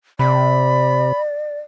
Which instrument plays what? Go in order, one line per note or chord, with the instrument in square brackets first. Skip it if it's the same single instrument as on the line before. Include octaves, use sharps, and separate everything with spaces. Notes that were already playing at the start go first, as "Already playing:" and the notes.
[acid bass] C3 [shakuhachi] D5 [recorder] B5